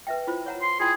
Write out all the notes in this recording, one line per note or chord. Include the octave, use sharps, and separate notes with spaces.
B4 E5 G5
E4 F4 C5
C#5 F#5 A#5
C6
E4 F4 G#4 G5